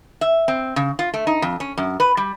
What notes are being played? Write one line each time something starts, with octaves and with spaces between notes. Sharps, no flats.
E5
C4
C#3
F4
A3
D#4
F2
C#4
F#2
B4
G3